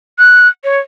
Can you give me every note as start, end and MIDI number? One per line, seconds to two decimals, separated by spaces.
0.19 0.48 90
0.64 0.79 73